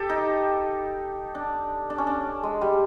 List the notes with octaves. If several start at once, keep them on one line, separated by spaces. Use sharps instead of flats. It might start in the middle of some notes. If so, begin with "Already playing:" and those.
Already playing: G4 A4
D#4
D4
D4
C#4
D4
G#3
G3